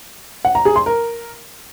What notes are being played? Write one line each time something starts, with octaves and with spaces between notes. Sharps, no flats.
F#5
A#5
G#4
C6
A#4